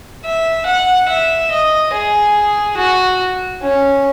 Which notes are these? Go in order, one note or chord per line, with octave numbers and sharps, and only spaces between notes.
E5
F#5
E5
D#5
G#4
F#4
C#4